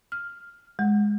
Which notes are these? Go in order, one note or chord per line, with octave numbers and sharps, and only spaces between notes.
F6
G#3